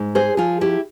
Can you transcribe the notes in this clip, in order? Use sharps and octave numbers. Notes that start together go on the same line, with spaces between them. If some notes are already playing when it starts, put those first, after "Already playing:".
Already playing: G#2
G#4 C5
F3 F4 G#4
E4 G4